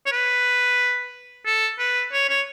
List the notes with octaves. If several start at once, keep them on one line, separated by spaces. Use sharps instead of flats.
C#5
B4
A4
B4
C#5
C#5